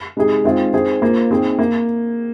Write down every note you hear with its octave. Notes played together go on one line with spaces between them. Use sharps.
C3 G#3 D#4 G#4
D#3 G#3 C4 F4 G#4
D#3 C4 G#4 C5
A#3 F4 C5
D#3 C4 G#4
A#3